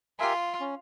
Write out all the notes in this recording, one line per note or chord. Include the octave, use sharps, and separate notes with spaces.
F4 G4 A#4 E5 G#5
C#4